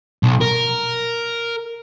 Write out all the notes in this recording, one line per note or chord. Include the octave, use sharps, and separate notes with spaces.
B1
A#4